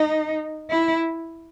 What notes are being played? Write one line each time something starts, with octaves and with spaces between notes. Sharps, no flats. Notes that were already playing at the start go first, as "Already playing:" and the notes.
Already playing: D#4
E4